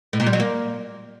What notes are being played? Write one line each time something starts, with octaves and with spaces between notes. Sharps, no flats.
A2
A#2
G3
F#3
A#3